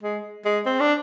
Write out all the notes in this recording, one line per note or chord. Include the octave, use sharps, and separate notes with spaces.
G#3
G#3
C4
D4